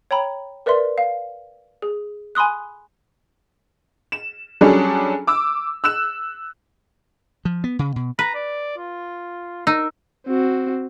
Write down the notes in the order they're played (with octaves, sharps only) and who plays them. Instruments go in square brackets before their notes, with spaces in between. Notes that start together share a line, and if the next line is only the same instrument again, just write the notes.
[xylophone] C#5 G5 A#5 B5
A#4 B4 D5 E5 C6
F5
G#4
G#5 B5 C6 D#6 F#6
[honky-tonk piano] E7
F#3 G3 C#4 D4 G#4 A4
D6 E6
E6 F#6 E7
[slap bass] F3
B3
C#3
B2
[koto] B4 [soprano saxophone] A#5
[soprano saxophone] D5
F4
[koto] D#4 [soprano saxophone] A#4 [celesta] E6
[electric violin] C4 F#4